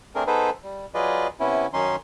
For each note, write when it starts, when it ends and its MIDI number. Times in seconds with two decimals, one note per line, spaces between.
0.15 0.24 57
0.15 0.24 60
0.15 0.24 62
0.15 0.24 68
0.15 0.24 70
0.27 0.50 59
0.27 0.50 63
0.27 0.50 68
0.27 0.50 69
0.27 0.50 71
0.27 0.50 72
0.63 0.86 55
0.94 1.27 54
0.94 1.27 65
0.94 1.27 68
0.94 1.27 71
0.94 1.27 74
0.94 1.27 75
1.40 1.67 48
1.40 1.67 59
1.40 1.67 61
1.40 1.67 64
1.73 1.96 42
1.73 1.96 51
1.73 1.96 61
1.73 1.96 63
1.73 1.96 84